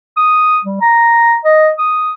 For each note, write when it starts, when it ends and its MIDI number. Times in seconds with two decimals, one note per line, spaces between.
0.17 0.58 87
0.65 0.79 55
0.81 1.37 82
1.45 1.71 75
1.78 2.13 87